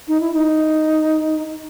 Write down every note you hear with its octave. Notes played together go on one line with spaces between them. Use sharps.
D#4
E4
D#4